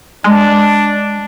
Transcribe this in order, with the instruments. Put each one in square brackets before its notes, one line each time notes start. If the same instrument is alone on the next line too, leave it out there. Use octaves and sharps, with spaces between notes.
[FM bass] G#3 [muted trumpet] D4